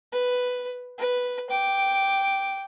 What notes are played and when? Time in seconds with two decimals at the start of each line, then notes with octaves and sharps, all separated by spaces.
0.12 B4
0.98 B4
1.50 G5 D6